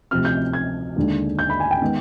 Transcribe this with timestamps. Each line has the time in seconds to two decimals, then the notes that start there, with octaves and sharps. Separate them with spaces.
0.11 D2 C3 F3 C4 F6
0.25 G6
0.53 G#6
0.96 D#2 D3 G#3 D4
1.39 G6
1.50 B5
1.60 G#5
1.71 G5
1.82 D#3 G#3 B3